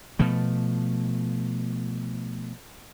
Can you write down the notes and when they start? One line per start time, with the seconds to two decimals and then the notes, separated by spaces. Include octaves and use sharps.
0.19 B2 F3 A3